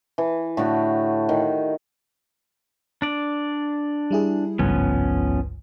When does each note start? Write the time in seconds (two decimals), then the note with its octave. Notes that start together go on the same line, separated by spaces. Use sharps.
0.18 E3
0.57 A2 D3 F#4 G4
1.29 D#3
3.02 D4 D5
4.11 G3 E4 G#4
4.59 G#1 C#2 G2 F3 B3 C#4